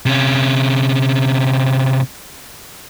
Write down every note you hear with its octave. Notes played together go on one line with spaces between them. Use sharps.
C3 C#4